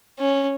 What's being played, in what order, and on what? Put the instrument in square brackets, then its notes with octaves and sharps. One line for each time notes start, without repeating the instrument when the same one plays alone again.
[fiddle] C#4